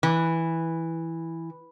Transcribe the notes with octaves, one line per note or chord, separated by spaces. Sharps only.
E3